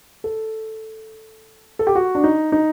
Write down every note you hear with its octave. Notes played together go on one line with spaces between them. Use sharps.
A4
A4
G4
F#4
D4
D#4
D#4